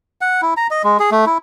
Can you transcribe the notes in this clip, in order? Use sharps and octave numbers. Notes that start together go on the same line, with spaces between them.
F#5
E4
A#5
D#5
G#3
G#4
A3
E4